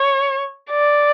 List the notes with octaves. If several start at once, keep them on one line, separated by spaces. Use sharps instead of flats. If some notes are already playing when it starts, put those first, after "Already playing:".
Already playing: C#5
D5